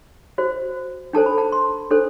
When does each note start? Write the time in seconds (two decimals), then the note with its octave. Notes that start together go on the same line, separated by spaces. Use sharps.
0.38 F#4 C5
1.13 D4 A4 C5 A5
1.26 B5
1.38 A5
1.52 C6
1.91 D4 A4 C5